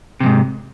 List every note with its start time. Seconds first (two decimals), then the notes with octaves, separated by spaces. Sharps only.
0.20 C3
0.23 F2
0.26 G#2